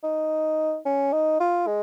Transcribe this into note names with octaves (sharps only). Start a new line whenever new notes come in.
D#4
C#4
D#4
F4
G#3